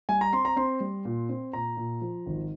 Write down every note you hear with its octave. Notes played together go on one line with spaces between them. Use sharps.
G3 G#5
A#5
C4 C6
A#5
C4 C6
G3
A#2
C4
A#2 A#5
A#2
F3
G#1